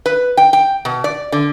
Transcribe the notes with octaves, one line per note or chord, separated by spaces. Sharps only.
B4
G5
G5
B2
D5
D3